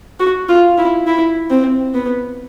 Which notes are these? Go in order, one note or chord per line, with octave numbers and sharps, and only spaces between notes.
F#4
F4
E4
E4
C4
B3